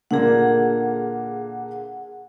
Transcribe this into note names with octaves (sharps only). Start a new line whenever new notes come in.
A#2 D3 A#3 G#4 F#5